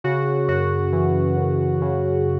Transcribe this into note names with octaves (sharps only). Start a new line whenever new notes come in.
C#3 F#4
F#2 F#4
E3
F#2
C#3